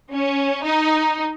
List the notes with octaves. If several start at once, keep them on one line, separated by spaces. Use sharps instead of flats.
C#4
D#4